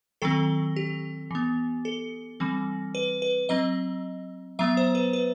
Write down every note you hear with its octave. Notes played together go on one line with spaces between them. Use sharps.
D#3 F#3 C4 A4
G4
E3 B3
A4
E3 G3 C4
B4
B4
F#3 C4 D#5
F#3 B3 E5
C5
B4
B4